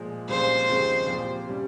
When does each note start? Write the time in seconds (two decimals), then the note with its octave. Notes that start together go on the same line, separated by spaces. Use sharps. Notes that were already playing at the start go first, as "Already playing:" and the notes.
Already playing: A#2 F3 G#3
0.29 C2 A#2 F3 G#3 C#4 C5
0.68 D#2 C#3 F3 G#3 C4
1.07 A#2 F3 C4 G4
1.47 C3 G3 C#4